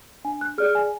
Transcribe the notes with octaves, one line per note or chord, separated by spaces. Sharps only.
D4 G#5
F#6
G#4 D5 F6
G#5